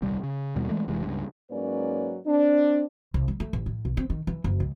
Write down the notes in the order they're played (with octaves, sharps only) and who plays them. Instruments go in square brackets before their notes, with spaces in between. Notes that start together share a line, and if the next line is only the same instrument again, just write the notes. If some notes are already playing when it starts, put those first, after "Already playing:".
[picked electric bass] D#1 C2 G3
C#3
D#2 B2 G3
E3 G#3 A3
F1 C3 E3 G#3
C#2 G2
[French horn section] G#2 F#3 A#3 C#4 B4 D5
C4 D4
[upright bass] C2
G3
A3
A1
A2
B1
C4
D#3
E3
F#1
C#2